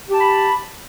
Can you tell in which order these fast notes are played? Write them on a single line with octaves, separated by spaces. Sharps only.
G4 A5 B5